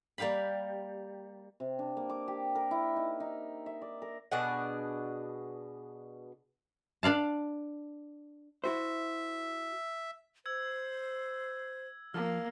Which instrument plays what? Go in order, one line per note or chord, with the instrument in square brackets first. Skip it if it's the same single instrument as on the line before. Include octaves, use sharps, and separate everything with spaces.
[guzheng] G3 A#3 G4 F5 B5
[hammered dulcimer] C3
D4
A#3
D6
G4
A#4
E4
D#4
D#4
E5
D5
A#4
[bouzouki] B2 D4 G#4 F#5
[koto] D4 D5 F5 A5
[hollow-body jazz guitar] E4 F#4 C5 [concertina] E5
[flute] C5 [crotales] E6 G#6
[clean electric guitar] F3 [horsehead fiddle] A#3 [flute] F5 [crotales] F6